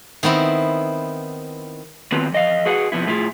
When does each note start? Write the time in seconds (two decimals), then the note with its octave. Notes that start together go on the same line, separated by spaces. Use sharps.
0.23 D#3 B3 C4 E4
2.12 D#3 F#3 B3 C4 F4 B4
2.32 F2 D#5 F5
2.66 F#4 G#4 B4 F#5
2.92 C3 F3 B3 E4
3.06 A2 G#3 B3 E4 F4 G#4